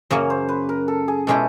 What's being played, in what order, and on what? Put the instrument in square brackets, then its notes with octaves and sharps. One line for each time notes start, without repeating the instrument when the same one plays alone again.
[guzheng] F#2 C#3 F#3 A#3 [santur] C#5
[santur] C5
B4
A#4
A4
G#4
[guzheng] B2 G#3 C#4 E4 G4 [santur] A4